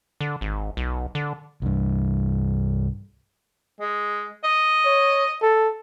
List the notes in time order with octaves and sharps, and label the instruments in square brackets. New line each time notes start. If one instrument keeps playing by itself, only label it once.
[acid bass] D3
G#1
B1
D3
[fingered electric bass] C2 G2
[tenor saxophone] G#3
D#5
[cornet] C#5
A4